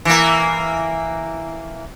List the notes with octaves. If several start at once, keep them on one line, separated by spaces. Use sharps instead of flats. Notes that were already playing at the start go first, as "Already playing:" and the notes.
E3 A#3